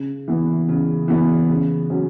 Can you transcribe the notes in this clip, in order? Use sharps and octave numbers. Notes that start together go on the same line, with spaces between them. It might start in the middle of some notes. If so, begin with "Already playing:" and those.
Already playing: C#3
E3 B3
C#3
E3 B3
C#3
F#3 C#4